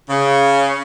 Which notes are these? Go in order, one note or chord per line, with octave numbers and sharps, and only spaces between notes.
C#3